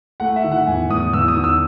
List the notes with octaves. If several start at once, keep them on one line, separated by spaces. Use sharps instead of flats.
A3 F#5
E5
D#3
F#5
E2 G#5
E2 D#6
E2 E6
D#6
D#3
E6